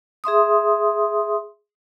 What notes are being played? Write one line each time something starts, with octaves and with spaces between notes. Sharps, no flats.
G#4 E5 C6 D#6